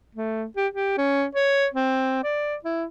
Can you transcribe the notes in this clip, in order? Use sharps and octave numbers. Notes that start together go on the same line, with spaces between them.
A3
G4
G4
C#4
C#5
C4
D5
E4